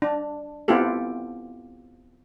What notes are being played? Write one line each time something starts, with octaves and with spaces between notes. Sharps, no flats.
D4
B3 C4 E4 F4 G4 A4